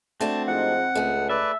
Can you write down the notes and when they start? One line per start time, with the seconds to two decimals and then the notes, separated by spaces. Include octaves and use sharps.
0.21 A3 C4 D4 F#4 A5
0.47 G#2 F3 D#4 F#5
0.95 C#2 A3 G#4
1.29 B4 D5 E5